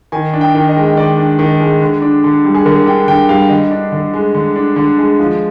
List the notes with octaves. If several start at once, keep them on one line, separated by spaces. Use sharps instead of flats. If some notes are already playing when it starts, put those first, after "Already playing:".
D#3 G#5
D4
G5
D#3
D#5
G#3
D#3 D5
D4
D#3
G#3
D3
D4
D3
G3
G#4
D3 A#4
D4 G5
D3 G5
G3 F5
D3 D#5
D4
D3
G#3
D3
D4
D3
G#3
F3